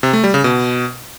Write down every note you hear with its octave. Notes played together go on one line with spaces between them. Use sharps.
C3
A3
G3
C#3
B2